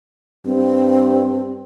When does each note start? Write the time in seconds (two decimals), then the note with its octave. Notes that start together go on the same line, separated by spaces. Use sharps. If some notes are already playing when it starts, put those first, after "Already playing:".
0.46 G2 C4